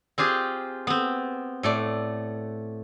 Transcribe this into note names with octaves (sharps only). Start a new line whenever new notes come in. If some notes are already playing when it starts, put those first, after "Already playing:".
C4 F4 G4 G#4
B3 C4
A2 A3 D5